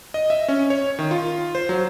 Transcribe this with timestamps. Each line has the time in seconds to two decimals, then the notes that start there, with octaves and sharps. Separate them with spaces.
0.14 D#5
0.30 E5
0.48 C#4
0.70 C#5
0.99 D#3
1.11 F4
1.55 C5
1.69 F#3